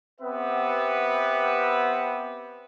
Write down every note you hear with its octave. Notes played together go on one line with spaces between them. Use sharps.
B3 C4 G4 B4 E5